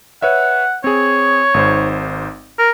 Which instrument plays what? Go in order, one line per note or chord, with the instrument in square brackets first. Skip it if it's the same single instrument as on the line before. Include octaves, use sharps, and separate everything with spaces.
[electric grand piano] B4 C#5 E5 [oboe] F#5
[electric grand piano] C4 G#4 [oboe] C#5
[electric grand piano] G#1 G#2 C5
[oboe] A#4